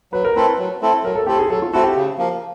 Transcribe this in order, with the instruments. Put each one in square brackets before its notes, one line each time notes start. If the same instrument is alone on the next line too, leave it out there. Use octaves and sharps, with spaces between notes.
[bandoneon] F#3 [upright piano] B4
[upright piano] A#4
[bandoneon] A3 C4 E4 A4 [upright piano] B4
[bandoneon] F#3
A3 C4 E4 A4
[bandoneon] F#3 [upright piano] A#4
[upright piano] A4
[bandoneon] A3 C4 E4 A4 [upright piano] G4
[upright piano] G#4
[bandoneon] F#3 [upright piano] A4
[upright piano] F4
[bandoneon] A3 C4 E4 A4 [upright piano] F#4
[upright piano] G4
[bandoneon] C#3
F3 A#3